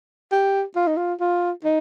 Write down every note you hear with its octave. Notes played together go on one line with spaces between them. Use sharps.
G4
F4
D#4
F4
F4
D#4